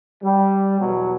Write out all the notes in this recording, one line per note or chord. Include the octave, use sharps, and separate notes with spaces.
G3
E2 B2 F#3